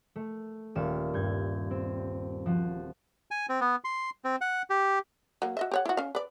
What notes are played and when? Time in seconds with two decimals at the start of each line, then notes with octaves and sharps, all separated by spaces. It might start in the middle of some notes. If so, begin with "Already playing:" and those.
0.16 A3
0.75 D#1 F5 E7
1.14 G2 G6 G#6
1.71 C4
2.46 F3 F#4
3.31 G#5
3.49 C4
3.61 B3
3.84 C6
4.25 C4
4.41 F#5
4.70 G4
5.42 F#3 A#3
5.57 F#4 D#5 E5
5.71 G4 C#5 F#5
5.86 E4 F#4
5.97 C#4 F5
6.15 B4 D5